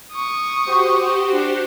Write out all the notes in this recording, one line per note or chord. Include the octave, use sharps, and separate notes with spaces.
C#6 D#6
F#4 G4 C5
D4